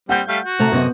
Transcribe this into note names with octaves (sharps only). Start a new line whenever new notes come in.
G3 C4 F#5 G6
G3 A3 F5
F#4
C3 A3 A#5
F#2 C3 B3 D#5